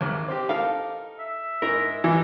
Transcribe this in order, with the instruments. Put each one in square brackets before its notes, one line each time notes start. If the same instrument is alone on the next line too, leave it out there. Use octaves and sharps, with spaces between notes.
[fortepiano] G#1 D#2 [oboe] D6
[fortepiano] C4 G4
[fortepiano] D#4 A4 A#4 [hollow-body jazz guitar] F5
[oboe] E5
[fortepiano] G#2 [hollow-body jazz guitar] A#4
[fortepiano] A1 [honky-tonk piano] E3